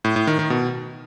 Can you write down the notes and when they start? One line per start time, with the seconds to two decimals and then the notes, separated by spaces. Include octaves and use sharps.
0.04 A2
0.16 A2
0.27 D#3
0.39 D#3
0.50 B2